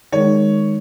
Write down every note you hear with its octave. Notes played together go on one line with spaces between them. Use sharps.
D#3 G#3 C#5